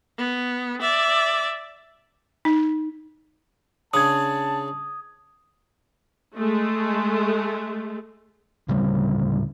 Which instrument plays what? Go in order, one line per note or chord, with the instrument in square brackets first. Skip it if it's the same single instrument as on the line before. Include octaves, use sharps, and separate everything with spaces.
[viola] B3
D5 E5
[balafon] D#4
[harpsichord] C#3 D4 [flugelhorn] A5 [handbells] D#6 G#6
[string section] G#3 A3
[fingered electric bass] D1 C#3 G3